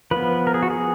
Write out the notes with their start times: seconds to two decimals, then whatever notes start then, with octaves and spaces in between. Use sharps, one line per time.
0.11 F3 B3 B4
0.47 A#4
0.54 G#4
0.62 F#4
0.70 G#4